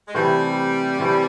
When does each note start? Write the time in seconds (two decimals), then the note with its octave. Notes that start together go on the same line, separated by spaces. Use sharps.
0.08 G#3
0.14 C3 E3 G3 A3 C4
0.98 C3 E3 A3 C4